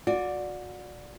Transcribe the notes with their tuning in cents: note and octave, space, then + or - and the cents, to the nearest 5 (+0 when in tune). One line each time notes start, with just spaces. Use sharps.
F#4 -30 D5 +0